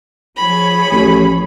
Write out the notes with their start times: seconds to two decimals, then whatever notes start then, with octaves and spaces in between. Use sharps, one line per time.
0.36 F3 G#4 C#5 B5
0.92 A1